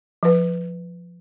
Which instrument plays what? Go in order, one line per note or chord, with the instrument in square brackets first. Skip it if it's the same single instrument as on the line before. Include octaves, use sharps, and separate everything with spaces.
[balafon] F3 B4